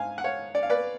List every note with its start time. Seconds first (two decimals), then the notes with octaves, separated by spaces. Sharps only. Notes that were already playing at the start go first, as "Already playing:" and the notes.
Already playing: G#2 F5 G#5
0.18 F#5
0.24 C#5 F5
0.55 D5
0.63 F5
0.70 B4 D5